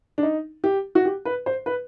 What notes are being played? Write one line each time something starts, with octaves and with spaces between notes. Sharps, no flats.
D4
D#4
G4
F#4
G4
B4
C5
B4